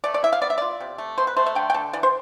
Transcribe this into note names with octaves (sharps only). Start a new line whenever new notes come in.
A3 D5
D5
E4 E5
F5
B3 D5
E5
F4 D5
C3
A3
B2 C5
B4
A3 C5
E5
D3 G5
G5
D3 A5
E3 D5
C5